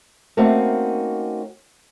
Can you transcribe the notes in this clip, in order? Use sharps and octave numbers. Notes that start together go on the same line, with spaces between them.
A3 A#3 C4 C#4 D#4 F#4